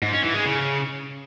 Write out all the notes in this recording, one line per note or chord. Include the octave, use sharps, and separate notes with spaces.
G#2
C#4
E3
G#3
C#3